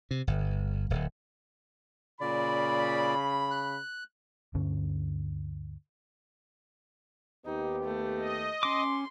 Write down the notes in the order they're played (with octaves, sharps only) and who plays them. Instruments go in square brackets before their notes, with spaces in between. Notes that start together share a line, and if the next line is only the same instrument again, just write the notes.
[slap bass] C3
G1
D1
[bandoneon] A#2 D5 [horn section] C#3 B5
[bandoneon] F#6
[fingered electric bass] D2 G2 D3 C#4
[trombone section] D#2 B3 G4 [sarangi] D#4
[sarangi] A3
[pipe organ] D#5
[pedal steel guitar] C#4 D6 [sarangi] C6